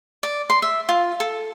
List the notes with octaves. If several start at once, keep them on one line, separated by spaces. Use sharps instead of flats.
D5
C6
E5
F4
A4